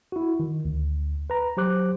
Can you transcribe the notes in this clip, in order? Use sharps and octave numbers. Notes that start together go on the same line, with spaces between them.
E4 F#4
D#3
D2
B4 A#5
F#3 G4 C5 D6 F#6